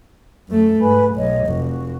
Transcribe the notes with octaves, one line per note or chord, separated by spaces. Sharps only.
F#2 A3
G#2 B4 G#5 B5
B1 C#5 D#5
F1 F#4